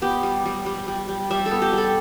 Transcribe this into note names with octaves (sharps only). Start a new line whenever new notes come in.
B3 G4
G3
G3
G3
G3
G3
G3 E5
A4
B3
G4
G3 A4